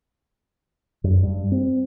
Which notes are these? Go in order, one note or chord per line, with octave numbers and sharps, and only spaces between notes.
F#2
G2
C4